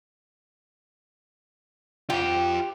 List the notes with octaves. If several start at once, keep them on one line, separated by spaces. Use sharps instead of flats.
F4 G4 G5